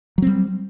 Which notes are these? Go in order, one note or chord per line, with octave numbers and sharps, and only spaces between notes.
F#3 G3 C4